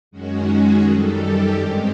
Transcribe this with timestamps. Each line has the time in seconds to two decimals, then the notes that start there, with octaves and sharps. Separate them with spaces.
0.11 F#2 D#3 G#3 C#4 F#4
0.47 G#4
0.82 F#2 D#3 G3 A4
1.17 G4
1.53 G2 D#3 G#3 C4 G4